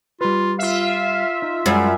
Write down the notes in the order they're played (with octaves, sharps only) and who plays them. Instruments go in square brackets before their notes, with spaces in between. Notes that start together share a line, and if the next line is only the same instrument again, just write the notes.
[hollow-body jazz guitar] G3 B4 [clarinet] F4
[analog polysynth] F4 E5 [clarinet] F5
[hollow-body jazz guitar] D#4
[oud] F#2 [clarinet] G3 [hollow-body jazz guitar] G#3